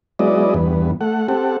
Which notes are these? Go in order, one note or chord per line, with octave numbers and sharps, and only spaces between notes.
F#3 G#3 B3 E4 D5 D#5
E2 G2 B3
A3 F#5
C4 G4 A4 F#5